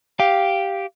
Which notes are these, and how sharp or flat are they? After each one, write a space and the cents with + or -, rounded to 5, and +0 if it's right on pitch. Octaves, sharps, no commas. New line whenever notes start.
G4 +0 F5 +0